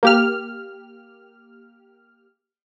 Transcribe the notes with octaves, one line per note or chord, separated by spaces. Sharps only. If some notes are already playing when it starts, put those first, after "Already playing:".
A#3 G4 F6